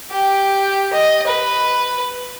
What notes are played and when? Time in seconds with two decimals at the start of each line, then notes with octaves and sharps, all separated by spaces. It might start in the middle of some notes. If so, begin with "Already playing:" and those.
0.11 G4
0.94 D#5
1.27 B4